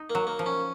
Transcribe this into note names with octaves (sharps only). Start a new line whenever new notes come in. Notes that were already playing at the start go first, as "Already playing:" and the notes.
Already playing: D#4
A#3
F#3
A#3
F3
C#4